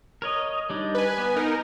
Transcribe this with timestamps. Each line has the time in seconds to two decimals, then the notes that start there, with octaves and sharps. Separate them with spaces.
0.22 A#4 C#5 D#5
0.70 G3 D4 D#4
0.95 B4 G#5
1.18 B3
1.36 D#4 A#4